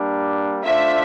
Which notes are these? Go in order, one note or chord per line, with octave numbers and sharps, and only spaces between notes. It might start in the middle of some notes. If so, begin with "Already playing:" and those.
Already playing: G3 A#3 D4
A3 D4 F4 C5 E5